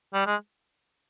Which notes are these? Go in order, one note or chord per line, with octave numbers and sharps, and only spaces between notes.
G3
G#3